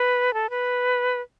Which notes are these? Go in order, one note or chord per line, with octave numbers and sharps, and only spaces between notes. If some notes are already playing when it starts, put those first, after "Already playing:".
Already playing: B4
A4
B4